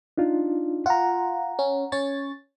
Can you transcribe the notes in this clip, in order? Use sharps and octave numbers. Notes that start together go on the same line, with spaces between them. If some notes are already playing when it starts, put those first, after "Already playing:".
D4 D#4 F4
F4 F#5 A#5
C#4
C#4 C#5 A6